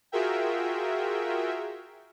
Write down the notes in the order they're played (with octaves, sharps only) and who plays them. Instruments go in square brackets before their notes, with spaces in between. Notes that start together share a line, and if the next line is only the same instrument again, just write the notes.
[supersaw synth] F4 F#4 G#4 A#4 E5 G5